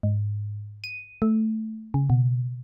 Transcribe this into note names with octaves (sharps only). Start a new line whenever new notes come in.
G#2
D#7
A3
C#3
B2